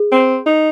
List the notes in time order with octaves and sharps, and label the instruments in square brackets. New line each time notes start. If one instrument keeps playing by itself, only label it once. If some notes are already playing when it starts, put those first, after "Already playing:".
Already playing: [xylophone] G#4
[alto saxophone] C4
D#4